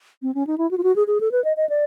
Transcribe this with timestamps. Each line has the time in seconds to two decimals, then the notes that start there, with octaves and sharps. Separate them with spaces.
0.22 C4
0.35 C#4
0.47 D#4
0.58 E4
0.71 F#4
0.78 F4
0.83 F#4
0.96 G#4
1.07 G#4
1.21 A4
1.32 B4
1.44 D#5
1.57 D#5
1.69 D5